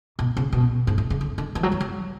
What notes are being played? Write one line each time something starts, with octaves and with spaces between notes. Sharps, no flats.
B2
C#3
B2
G#2
A2
C#3
D3
D3
E3
F#3
E3
F#3